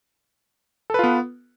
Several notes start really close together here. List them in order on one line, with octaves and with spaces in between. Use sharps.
A4 B4 F4 B3